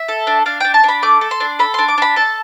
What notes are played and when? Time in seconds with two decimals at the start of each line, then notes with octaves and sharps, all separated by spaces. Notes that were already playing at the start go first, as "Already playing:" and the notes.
Already playing: E5
0.08 A4
0.27 D4
0.46 D4 F5
0.60 D4 G5
0.74 A5
0.84 D4 B5
1.03 A3 D6
1.21 A4
1.31 C6
1.40 D4
1.59 A4 B5
1.74 D4 C6
1.88 D6
1.98 D4 B5
2.16 A4 A5